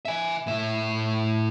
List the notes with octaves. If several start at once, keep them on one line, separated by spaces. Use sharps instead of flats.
E5 G#5
A2 E5